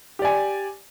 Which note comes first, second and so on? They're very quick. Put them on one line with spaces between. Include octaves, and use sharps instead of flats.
G4 D5 G#5